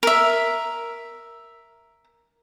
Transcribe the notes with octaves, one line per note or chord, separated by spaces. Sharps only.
A#4 E5